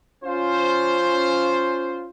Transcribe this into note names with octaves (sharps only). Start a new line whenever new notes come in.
C#4 F4 C5